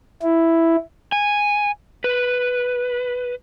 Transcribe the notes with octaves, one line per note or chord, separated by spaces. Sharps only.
E4
G#5
B4